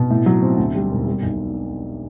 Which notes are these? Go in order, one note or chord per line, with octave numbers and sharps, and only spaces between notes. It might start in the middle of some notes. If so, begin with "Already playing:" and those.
Already playing: B2
A2
F#3
C4
D2
G3
E1
G3
B1